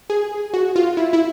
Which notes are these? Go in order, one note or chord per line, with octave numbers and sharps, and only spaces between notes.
G#4
F#4
F4
E4
E4